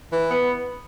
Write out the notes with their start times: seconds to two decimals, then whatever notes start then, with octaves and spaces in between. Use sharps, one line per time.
0.11 E3
0.27 B3